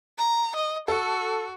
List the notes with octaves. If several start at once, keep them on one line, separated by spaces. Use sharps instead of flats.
A#5
D#5
F#4 A4